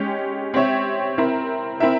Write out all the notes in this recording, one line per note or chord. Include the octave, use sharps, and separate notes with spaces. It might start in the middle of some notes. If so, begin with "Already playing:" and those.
Already playing: G#3 C#4 G4
C4 G4 C#5 E5
C4 E4 A#4 E5
C4 E4 A#4 E5